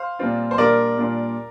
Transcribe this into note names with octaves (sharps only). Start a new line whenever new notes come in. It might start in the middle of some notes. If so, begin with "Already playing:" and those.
Already playing: C5 F5
A#2 G3 C4 F4
C5
A#2 G3 D4 F4 A#4 D5
A#2 G3 D4 F4